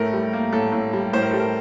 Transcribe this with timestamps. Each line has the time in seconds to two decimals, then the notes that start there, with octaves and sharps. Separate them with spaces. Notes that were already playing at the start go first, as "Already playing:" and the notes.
Already playing: A2 A3 A#4
0.13 G3
0.33 A#3
0.53 A2 A4
0.72 A2
0.93 G3
1.13 A2 C5
1.22 A#4
1.31 G3 A4
1.40 A#4